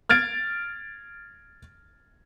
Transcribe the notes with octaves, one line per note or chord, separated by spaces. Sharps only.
F6 G#6 A6 D7